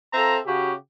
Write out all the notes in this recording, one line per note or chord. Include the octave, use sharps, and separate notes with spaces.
C4 F4 A4 E5 A#5
C#3 F#4 G4